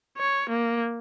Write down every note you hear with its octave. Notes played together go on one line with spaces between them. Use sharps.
C#5
A#3